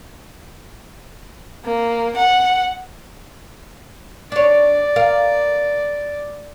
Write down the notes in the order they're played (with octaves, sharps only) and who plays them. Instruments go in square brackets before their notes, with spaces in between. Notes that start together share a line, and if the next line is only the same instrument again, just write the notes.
[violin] A#3
F#5
[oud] D4 C#5 [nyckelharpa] D5
[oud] A#4 F5